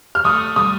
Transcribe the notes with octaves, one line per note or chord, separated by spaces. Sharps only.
F6
A3 D#6
G3 D#6